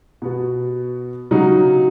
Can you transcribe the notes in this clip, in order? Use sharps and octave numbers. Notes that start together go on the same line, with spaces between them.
B2 B3 F#4
C#3 F#3 D#4 F#4